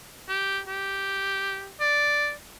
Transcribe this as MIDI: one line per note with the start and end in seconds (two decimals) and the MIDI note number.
0.29 0.59 67
0.67 1.69 67
1.80 2.31 74